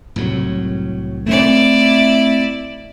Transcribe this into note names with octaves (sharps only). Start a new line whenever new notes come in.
C2 A2 F#3
A3 C4 E4 D5